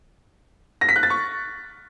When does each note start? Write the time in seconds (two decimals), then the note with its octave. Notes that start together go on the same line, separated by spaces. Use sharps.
0.81 A#6
0.89 B6
0.96 F#6
1.03 A6
1.10 C#6